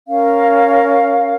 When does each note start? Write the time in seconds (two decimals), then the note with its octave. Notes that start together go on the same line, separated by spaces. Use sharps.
0.07 C#4 A#4 F5